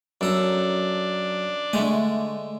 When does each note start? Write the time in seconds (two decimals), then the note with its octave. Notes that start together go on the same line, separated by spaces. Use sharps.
0.21 F#2 D4 A4 A#5
1.73 D3 G#3 A3 G#5